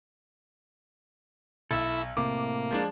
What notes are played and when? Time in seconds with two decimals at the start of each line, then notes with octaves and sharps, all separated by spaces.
1.71 B1 E4 A4 E5 E6
2.17 A2 C3 A#3 D6
2.71 F3 G#3 D4